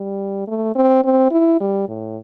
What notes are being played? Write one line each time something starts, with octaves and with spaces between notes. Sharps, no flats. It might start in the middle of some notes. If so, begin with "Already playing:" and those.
Already playing: G3
A3
C4
C4
E4
G3
A2